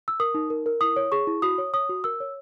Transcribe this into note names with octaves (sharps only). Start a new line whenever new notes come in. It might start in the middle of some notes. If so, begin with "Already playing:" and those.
E6
A#4 D#6
D#4
A#4
A#4
E4 D#6
C#5
G#4 C#6
E4
F#4 D#6
C#5
C#5 D#6
F#4
A#4 E6
C#5